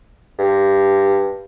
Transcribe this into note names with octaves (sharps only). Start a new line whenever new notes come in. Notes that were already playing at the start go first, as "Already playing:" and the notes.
G2